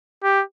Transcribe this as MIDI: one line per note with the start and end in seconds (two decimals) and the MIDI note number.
0.23 0.43 67